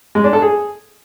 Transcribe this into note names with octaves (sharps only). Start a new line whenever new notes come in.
G#3
D4
A4
G#4